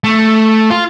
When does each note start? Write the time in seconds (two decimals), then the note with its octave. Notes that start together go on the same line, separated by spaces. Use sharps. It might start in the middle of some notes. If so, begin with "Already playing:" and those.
0.04 A3
0.71 F4